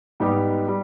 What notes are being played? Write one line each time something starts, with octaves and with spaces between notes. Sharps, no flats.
G#2 G3 B3 D#4 G4
G3